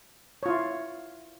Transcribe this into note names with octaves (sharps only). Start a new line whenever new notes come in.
E4 F4 C#5